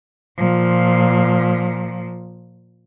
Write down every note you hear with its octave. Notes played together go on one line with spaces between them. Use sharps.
A#2 F3